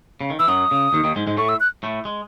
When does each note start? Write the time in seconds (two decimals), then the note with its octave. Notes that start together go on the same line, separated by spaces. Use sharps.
0.21 C#3
0.30 D#3
0.39 E3 E6
0.48 F#2 F#3 D#6
0.71 C#3
0.93 D#2 D#3
1.04 D#2 D#3
1.16 G#2 G#3
1.27 G#2 G#3
1.37 A2 A3 C#6
1.49 E6
1.60 F#6
1.83 A2 A3
2.05 G#3